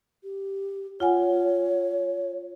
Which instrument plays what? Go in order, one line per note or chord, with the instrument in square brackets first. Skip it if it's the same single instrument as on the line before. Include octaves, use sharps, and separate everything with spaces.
[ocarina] G4
[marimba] F4 F#5 G#5 [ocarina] C#5